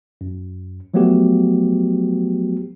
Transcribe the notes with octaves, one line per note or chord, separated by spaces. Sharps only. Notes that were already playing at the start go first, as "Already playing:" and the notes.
F#2
F3 F#3 A3 B3 F#4 G4